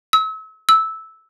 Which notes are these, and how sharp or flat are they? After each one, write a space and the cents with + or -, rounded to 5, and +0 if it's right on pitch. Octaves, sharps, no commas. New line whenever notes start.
E6 -35
E6 -10